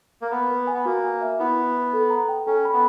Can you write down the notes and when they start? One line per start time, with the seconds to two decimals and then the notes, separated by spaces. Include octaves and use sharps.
0.22 A#3
0.31 B3 B4
0.49 B4
0.67 G#5
0.74 B3
0.85 A#3 F#4
1.04 G#5
1.21 E5
1.39 B3 E4
1.56 E4
1.74 B4
1.93 A4
2.10 A#5
2.28 G5
2.47 C#4 A4
2.65 B5
2.73 B3